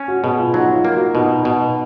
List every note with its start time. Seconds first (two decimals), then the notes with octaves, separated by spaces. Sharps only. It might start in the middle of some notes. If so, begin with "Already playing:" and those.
Already playing: C#4
0.08 F#4
0.23 B2 G#4
0.39 F4
0.54 F#3 D#4
0.74 F4
0.85 A#3
0.94 F#4
1.15 B2 D#4
1.45 B2